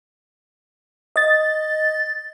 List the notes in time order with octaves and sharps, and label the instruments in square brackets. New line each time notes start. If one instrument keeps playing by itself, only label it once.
[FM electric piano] D#5 A6